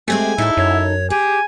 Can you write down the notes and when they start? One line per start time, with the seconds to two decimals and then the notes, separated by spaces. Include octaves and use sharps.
0.08 G#3 A3 C4 G4 G#5
0.38 A2 D#4 E4 A4
0.57 F#2 C#5
1.10 G4 G#4 G#5